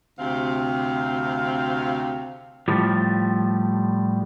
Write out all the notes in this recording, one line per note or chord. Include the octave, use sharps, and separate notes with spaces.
D2 C3 C4 F5
A2 F3 G3